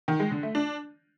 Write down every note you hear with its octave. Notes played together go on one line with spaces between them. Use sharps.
D#3
G#3
D3
A3
D4